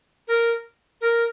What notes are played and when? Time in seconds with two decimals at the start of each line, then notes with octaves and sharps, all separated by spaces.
0.28 A#4
1.01 A#4